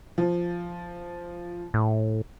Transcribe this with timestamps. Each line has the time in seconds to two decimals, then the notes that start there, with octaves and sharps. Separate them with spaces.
0.18 F3
1.74 A2